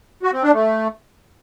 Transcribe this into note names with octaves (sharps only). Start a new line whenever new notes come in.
F#4
C4
D4
A3